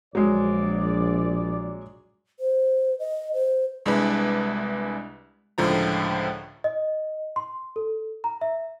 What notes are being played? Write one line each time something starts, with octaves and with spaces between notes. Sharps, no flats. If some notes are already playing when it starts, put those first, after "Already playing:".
A#1 F#3 G#3 D5
C5
D#5
C5
C2 G#3 D4 E4 B4
C#2 A2 D3 F3 A#5
D#5
C6
A4
A#5
E5